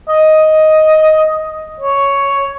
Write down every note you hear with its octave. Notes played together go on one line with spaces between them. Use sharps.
D#5
C#5